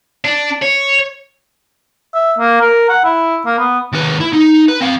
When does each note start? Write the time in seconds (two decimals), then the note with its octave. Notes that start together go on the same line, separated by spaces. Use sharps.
0.25 D4
0.62 C#5
2.14 E5
2.38 A#3
2.61 A#4
2.89 F#5
3.04 E4
3.46 A#3
3.58 B3
3.92 D#2 B4
4.20 E4
4.33 D#4
4.68 B4
4.81 C4 F5